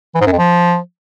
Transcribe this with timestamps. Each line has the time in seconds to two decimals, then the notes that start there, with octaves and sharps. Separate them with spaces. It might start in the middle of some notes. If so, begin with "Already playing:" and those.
0.15 E3
0.21 G#2
0.26 F#2
0.32 F2
0.38 F3